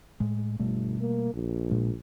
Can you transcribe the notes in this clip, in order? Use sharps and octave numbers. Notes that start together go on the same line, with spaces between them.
A2 G#3
G1 B2 G3 A3
A#3
A#1
A#2 G#3